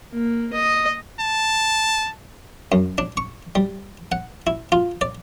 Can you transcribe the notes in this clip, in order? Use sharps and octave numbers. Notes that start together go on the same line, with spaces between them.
A#3
D#5
A5
F#2
D4
C#6
G3
F#5
E4
F4
D5